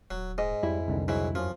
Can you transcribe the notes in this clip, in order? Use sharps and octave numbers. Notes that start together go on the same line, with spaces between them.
D#1 F#3
G#2 D#5
F2 G3 E4
C2 D3 D#3
G#2 F#3 E4
F#2 F3 C#4